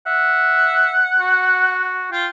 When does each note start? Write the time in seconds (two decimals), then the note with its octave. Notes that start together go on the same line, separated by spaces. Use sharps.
0.06 E5 F#5
1.20 F#4
2.12 F4 G5